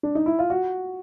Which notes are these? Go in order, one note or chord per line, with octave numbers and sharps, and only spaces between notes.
D4
D#4
E4
F4
F#4